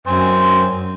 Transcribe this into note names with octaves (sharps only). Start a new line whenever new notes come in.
F#2 C4 G#5 C6